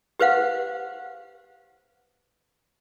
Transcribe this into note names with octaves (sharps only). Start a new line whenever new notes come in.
G4 B4 C5 F5 F#5